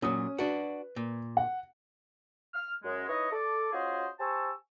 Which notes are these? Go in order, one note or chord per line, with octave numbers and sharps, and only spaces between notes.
A#2 F#3 C#4 D#6
D4 F#4 B4
A#2
F#5
F6
F#2 G#3
D#4 E4 B4 C#5 D#5
A4 D5
C#4 F4 F#4 G#4 C5 D#5
G4 C5 G#5 A5 C#6 E6